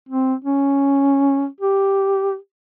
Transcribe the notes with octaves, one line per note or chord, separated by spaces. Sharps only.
C4
C#4
G4